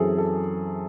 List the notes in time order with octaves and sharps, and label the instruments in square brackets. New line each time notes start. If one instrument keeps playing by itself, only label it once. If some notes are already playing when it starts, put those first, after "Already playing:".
Already playing: [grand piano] F#2 E3 C4 G#4 A4
A4